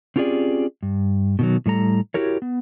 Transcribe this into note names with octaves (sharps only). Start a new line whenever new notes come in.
C4 C#4 F4 G4 G#4 D5
G2
B2 D#3 F#3
A2 G3 A4 A#5
E4 F#4 G4 A#4 C#5
B3